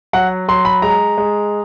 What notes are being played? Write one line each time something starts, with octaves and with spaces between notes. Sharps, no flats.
F#3 F#5
F#3 C6
B5
G#3 A#5
G#3